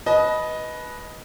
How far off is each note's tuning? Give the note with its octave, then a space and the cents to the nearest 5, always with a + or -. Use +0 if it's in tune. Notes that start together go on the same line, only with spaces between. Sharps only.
B4 -10 D#5 +5 A5 -35